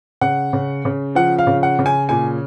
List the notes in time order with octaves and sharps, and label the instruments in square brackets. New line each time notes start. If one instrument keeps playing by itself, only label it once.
[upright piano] C#3 F#5
C#3
C#3
F3 F#5
F5
C#3
F#5
C#3
G#5
A#2 G#5